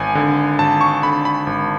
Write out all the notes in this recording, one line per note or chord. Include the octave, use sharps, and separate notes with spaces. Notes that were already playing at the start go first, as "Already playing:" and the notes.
Already playing: G#1 G#5
D3
G#1 A5
C#6
D3 B5
B5
G#1